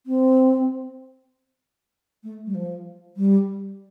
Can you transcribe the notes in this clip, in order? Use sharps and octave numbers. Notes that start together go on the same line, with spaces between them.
C4
A3
G3
F3
G3